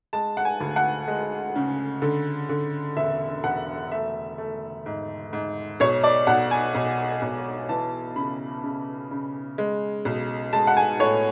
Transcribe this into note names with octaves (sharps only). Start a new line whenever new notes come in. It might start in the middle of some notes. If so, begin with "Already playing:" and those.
G#3 A5
F#5
G#5
D2
F#5
G#3
C#3
D3
D3
E1 E5
E1 F#5
A3 E5
A3
G#2
G#2
B1 C#5
D5
B1 F#5
G#5
B1
B1
E3 A5
C#3 B5
C#3
C#3
G#3
B1
G#3 A5
F#5
G#5
A2 C#5